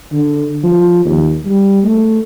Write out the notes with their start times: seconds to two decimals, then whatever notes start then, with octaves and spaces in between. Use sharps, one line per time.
0.12 D3
0.64 F3
1.05 D#2
1.45 G3
1.84 A3